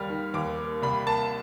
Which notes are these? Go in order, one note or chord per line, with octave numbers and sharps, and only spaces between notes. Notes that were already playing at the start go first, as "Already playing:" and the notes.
Already playing: D#2 G3 A#3 F6
D#3
D#2 D6
A#3
C2 B5
A#3 A5